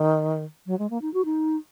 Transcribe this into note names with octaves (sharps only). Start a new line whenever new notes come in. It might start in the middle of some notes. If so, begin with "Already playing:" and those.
Already playing: D#3
F#3
G#3
A#3
D#4
F#4
D#4